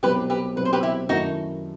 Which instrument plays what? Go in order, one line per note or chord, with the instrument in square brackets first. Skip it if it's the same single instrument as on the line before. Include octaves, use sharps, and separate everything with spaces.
[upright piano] C2 B2 F#3 C4 [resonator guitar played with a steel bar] G4 B4
[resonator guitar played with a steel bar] G4 B4
[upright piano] C2 B2 F#3 C4 [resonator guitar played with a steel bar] B4
[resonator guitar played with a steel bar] C5
G4 B4
E4 G4
[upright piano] F#2 D#3 A3 E4 [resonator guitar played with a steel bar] D#4 F#4